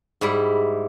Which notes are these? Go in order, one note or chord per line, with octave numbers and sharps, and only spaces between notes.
G#2 G3 E4